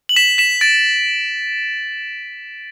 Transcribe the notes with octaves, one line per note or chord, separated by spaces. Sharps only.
F#7
B6 E7
B6 E7
A6 D7